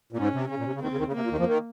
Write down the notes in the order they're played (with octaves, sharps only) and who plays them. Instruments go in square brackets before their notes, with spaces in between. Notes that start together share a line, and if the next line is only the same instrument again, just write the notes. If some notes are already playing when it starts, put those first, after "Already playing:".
[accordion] A#2
[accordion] G#2 [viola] C#4
[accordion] C3
[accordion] C#3 [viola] C#4
[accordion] A#2
C3
C#3
[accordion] D#2 D#3 [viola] C4
[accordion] C#3
D#2 D#3
C#3
[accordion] C3 [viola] A#3
[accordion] A#2
D#2 D#3
F2 F3
D#3